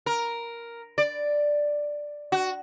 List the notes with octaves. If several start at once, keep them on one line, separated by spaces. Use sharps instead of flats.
A#4
D5
F#4